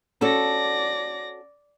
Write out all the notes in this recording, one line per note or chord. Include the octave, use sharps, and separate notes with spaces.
C#4 F#4 A4 D5 A#6